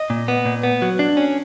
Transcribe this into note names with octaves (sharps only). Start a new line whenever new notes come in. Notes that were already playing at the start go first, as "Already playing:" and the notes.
Already playing: D#5
A#2
B3
A#2
B3
F#3
D4
C#4